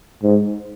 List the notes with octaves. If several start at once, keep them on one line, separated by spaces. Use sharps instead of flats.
G#2